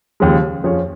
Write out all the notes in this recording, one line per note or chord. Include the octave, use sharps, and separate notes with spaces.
D#2 C#3 F3 G#3
F2 F3 C#4 G#4 C#5